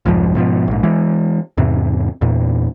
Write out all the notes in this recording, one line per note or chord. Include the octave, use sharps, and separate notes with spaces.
C2 F2 G#2 F3
G#2 B2 F3
A#1 G#2
E3 G#3
E2 G#2 C3
E2 A#2